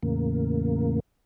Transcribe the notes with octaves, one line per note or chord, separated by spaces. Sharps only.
E2 A2 C#3 A#3